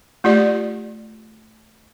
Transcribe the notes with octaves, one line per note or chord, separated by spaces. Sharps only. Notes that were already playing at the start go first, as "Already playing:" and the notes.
A3 F4 G4 D5